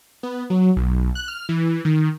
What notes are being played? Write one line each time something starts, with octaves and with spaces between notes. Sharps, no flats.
B3
F#3
B1
F#6
F6
E3
D#3